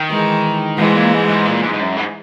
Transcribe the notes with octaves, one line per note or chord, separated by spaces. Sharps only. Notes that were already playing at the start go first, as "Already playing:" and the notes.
Already playing: D#3
E3 G#3
G#2 E3 G#3
A#2
G#2
G#2
A#2
G#2
G#2
F#2
G#2